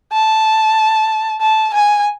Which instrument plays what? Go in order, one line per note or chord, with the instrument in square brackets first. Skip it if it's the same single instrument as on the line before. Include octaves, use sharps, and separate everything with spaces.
[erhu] A5
A5
G#5